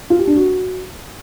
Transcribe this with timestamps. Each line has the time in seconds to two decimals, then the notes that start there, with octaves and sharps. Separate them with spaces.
0.10 F4
0.19 G4
0.27 D4
0.36 F#4